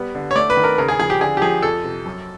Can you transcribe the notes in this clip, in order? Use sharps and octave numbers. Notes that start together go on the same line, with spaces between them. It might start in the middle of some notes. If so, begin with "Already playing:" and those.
Already playing: G3 B3
D3
C#5
A3 D5
B4
D#3
A#4
C#3 A#4
G#4
F3 G#4
G4
D3 G#4
G4
F3 G#4
F2 A4
C3
F#2